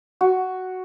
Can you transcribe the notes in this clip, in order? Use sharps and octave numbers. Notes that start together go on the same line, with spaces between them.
F#4